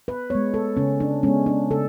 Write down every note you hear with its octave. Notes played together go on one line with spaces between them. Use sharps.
B4
G#3 B3 C#5
A4
C#3 C#4
D4
G#3 B3 C#4
D4
C#3 A4